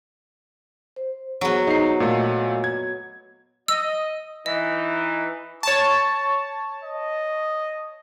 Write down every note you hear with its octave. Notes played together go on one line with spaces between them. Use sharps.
C5
F#3 B3 G#4 C5
D#4 C7
A#2 A3 D#5
G#6
D#5 E6
E3 D#4 D#5
C#5 A5 C#6
D#5